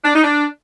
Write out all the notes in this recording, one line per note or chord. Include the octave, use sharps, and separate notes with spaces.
D4
D#4
D4